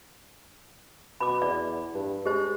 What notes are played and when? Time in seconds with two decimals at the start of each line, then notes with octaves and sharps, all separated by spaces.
1.20 B2 B5 D6
1.42 E2 D5
1.94 G2
2.26 G#3 G4 C5